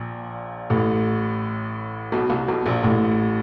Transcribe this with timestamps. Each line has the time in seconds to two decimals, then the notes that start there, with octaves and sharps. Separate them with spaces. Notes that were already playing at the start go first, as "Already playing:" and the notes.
Already playing: A#1 A#2
0.70 A1 A2
2.12 B1 B2
2.30 C2 C3
2.48 B1 B2
2.66 A#1 A#2
2.83 A1 A2